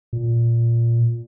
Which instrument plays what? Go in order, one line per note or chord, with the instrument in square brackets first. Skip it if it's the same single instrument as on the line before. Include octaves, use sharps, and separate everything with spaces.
[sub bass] A#2